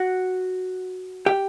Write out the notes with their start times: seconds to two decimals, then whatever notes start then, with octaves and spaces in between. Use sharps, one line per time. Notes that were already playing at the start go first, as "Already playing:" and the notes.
Already playing: F#4 F#5
1.26 G4 G5